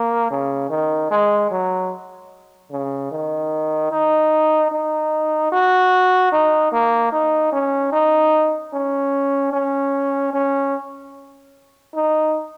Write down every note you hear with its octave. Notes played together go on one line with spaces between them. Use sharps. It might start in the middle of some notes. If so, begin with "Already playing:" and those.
Already playing: A#3
C#3
D#3
G#3
F#3
C#3
D#3
D#4
D#4
F#4
D#4
A#3
D#4
C#4
D#4
C#4
C#4
C#4
D#4